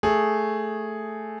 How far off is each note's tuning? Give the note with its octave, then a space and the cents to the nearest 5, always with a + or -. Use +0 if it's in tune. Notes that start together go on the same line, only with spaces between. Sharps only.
A3 +0 G#4 +0